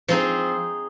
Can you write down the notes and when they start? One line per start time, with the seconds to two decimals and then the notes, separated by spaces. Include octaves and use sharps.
0.08 F3 C4 D#4 G#4